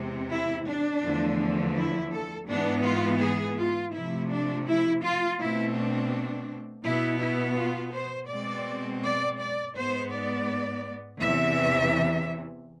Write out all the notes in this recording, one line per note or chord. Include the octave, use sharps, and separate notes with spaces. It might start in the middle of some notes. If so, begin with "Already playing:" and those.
Already playing: E2 C3 G#3 C4
E4
D4
E2 D3 F3 A3
E4
A4
G#2 E3 G#3 B3 D4
F4
G#4
F4
C3 F3 A3 E4
D4
E4
F4
B2 A3 C4 E4
D4
B2 B3 E4
E4
F4
C5
B2 G#3 C4 D5
D5
D5
G#2 G#3 B3 C5
D5
E2 C3 E3 E5